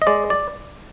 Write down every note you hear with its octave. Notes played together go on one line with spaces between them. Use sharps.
D#5
G#3 D5
D5